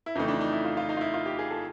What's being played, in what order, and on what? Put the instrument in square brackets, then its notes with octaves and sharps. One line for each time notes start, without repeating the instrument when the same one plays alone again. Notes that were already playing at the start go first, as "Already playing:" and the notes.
[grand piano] E4
F2 C#3 E3 A3 D#4
D4
D#4
E4
F4
F4
D#4
F4
E4
F4
G4
G#4
A4